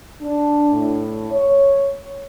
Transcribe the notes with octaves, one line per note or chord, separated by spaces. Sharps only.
D4
A2
C#5